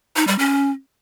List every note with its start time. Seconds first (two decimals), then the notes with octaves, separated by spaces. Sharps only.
0.16 D#4
0.27 G3
0.39 C#4